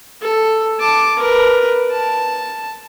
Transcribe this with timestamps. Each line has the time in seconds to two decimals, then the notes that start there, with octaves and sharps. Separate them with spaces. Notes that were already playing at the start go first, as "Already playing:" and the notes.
0.22 A4
0.79 A5 D6
1.19 A#4 B4
1.91 A5